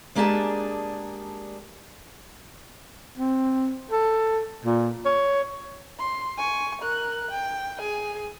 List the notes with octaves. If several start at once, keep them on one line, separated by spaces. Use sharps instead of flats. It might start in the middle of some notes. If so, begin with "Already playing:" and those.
G#3 A#3 D4 G4 G#4 A5
C4
A4
A#2
C#5
C6
G#5 C#6
A#4 F#6
G5
G#4 G#5